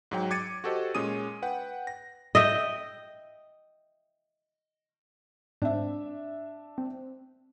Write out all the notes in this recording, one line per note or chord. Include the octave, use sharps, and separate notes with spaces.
G#2 F#3 G5
D6 G#6 A6 C#7 D#7
F#4 G4 A4 C5 D#5
A#2 G#3 C#4 D#6 D#7
B4 F#5 G5
A#6
D#5 E5 G5
G#2 C4 D4 E5
C4